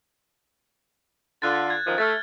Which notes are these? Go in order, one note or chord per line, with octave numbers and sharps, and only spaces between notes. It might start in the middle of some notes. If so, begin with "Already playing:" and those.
D3 F4 F#6 A6
G#6
F#2 D#3 F3
A3 F6 A6